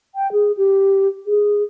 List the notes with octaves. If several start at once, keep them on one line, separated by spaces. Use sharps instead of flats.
G5
G#4
G4
G#4